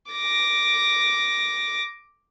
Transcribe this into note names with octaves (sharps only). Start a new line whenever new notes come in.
D6 A#6